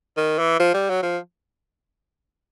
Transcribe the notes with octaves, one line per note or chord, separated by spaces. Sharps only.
D#3
E3
F3
G3
F#3
F3